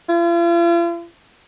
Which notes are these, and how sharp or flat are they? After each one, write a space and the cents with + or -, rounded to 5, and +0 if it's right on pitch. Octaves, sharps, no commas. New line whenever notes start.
F4 -45